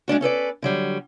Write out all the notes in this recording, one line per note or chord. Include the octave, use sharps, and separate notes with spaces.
G#3 C#4 D4 F#4
C#4 A4 B4 D5
D3 F#3 G3